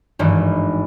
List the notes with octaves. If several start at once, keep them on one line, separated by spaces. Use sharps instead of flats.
G#1 G2 D#3 E3